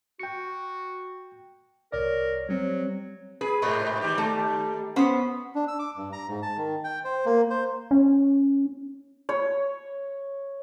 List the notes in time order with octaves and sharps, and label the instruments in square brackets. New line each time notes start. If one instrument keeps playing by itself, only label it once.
[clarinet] F#4 [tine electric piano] G5 C#7
[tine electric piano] C2 C#5 D5 [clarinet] A#4
[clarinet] F#3 [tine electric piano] G3 C4
[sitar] G#4 [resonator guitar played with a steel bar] B4
[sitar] G#2 C3 [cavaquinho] A#4 C#5 B5
[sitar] D#3 G3 G4
[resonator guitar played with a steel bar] A3 [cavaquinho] A#5
[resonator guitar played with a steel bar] B3 C#4 C5 [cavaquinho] B5 D#6
[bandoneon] D4
E6
D6
G2
A#5
G#2
A5
D#3
G5
C5
A#3
C5
[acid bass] C#4
[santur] C#5